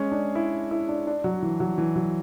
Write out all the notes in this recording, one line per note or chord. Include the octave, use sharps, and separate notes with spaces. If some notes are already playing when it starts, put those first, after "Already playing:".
Already playing: G#3 C#4
D4
E4
E4
D4
D4
F#3
E3
F#3
E3
F#3